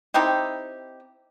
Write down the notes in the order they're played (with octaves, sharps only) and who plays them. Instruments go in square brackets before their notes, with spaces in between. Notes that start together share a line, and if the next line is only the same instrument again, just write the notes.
[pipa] C4 D#4 E4 G4